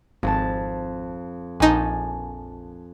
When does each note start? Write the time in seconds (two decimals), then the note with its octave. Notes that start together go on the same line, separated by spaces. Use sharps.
0.23 G#1 F2 A5
1.60 A#1 D#4 G#5 A5